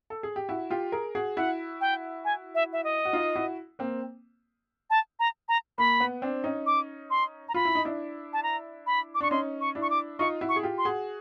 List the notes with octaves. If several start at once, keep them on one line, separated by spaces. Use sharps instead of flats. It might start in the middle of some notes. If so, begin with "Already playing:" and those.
A4
G#4
G4
E4 F#4
F4 G4
G#4 A#4
F#4 G#4
E4 F#4 F#5
G5
G#5
E5
E5
D#5
F#4
D#4 F4
E4 F#4
A#3 C4
A5
A#5
A#5
A#3 B5
B3
C4 D4
C#4 D#4
D6
C6
A#5
F4 B5
E4
D#4
D4 E4
A5
A#5
B5
D6
D4 C#6
C#4 D#4 C6
C#6
D4 E4
C#6
D6
D#4 F4 C#6
E4 F#4
C#6
G#4
F4 G4
C6
F#4 G#4